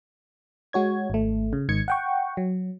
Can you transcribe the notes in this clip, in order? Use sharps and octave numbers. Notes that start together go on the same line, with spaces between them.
G#3 F#4 C#5 G#6
G#1 A3
C#3
G#1 G#2 D#3 G#6 C#7
F#5 G5 C#6
F#3